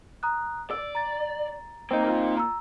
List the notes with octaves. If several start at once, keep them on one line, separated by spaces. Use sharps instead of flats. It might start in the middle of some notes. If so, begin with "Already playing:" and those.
A#5 D#6 F#6
D5 E6
A#5 A6
A#3 C4 D#4
A#3 F4
A#5 E6